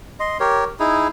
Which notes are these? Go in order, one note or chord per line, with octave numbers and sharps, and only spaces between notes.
D#5 C6
G4 A#4 C#5
D#4 E4 G#4